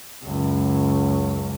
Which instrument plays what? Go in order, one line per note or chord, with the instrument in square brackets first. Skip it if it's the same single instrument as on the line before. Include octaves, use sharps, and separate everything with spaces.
[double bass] C#2 F#2